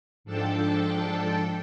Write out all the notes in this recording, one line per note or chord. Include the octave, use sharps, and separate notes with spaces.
G#2 F3 D4 A4 G5 A5